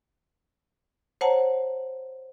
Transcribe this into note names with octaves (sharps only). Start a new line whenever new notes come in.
C5 C#5 F#5 A5 A#5